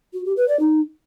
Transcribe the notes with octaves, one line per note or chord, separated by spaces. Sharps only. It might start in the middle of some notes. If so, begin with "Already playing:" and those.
F#4
G4
B4
D5
D#4